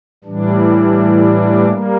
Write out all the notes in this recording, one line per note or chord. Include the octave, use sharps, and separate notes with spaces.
A2 E3 G3 D4
G3 A#3